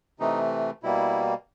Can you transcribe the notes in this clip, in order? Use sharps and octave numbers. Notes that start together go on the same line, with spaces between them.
C3 E3 A3 D#4
B2 G3 A#3 E4